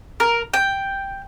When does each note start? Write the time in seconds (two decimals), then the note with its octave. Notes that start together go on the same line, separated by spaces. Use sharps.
0.20 A#4
0.54 G5